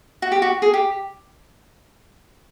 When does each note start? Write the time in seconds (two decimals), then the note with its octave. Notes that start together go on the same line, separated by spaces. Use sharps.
0.22 F#4
0.32 G4
0.42 F#4
0.62 G#4
0.74 G4